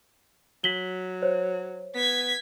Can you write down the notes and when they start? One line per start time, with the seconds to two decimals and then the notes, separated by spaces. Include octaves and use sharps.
0.64 F#3 B6 F#7 G7
1.22 C5 C#5
1.95 B3 G#6 B6